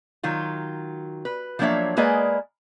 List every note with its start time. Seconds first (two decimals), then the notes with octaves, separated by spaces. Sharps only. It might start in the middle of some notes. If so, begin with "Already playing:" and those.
0.23 D#3 F#3 F4
1.25 B4
1.59 F3 F#3 A#3 D4 C#5 E5
1.97 G#3 A#3 G#4 B4 D5 D#5